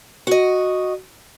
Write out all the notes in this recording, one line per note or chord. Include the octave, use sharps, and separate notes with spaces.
F#4 D#5